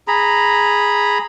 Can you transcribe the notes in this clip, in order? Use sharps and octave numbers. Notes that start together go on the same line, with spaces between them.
G#4 A#5 B5